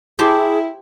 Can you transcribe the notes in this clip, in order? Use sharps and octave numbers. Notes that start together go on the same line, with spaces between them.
E4 G4 G#4 C5 A5